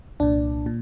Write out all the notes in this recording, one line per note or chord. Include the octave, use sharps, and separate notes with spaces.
C2 A#2 D4
A#2